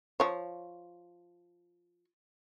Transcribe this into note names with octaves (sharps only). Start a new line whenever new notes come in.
F3 C#5